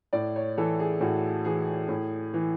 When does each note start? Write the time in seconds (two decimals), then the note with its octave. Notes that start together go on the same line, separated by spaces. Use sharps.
0.13 A2 D5
0.36 C#5
0.58 E3 A4
0.79 G#4
1.01 A2 F#4
1.45 E3 G#4
1.89 A2
2.34 E3